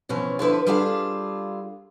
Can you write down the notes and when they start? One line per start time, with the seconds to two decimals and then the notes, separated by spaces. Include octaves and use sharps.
0.09 B2 E3 F3 C#4
0.39 D3 F3 E4 B4
0.67 G3 D4 F4 G#4 A4 F5